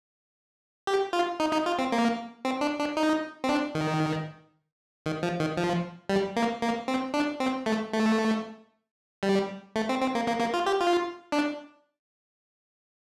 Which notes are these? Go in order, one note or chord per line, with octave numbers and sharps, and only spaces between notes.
G4
F4
D#4
D#4
F4
C4
A#3
C4
D4
D4
D#4
C4
D4
D#3
D#3
F3
D#3
F3
G3
A#3
A#3
C4
D4
C4
A3
A3
G3
A3
C4
C4
A#3
A#3
A#3
F4
G4
F4
D4